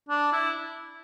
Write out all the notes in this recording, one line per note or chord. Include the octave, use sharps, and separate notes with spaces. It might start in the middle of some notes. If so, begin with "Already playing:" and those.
D4
E4